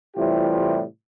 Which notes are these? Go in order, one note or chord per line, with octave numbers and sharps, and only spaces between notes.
A2 C3 E3 G3 F4 G4